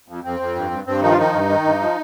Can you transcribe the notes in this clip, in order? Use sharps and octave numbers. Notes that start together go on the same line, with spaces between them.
F2
F2 C4
F2
G2
G2
G2 C4
D#3 F3 D#4
F4
D#3 D#4
G2
D#3
G2
F3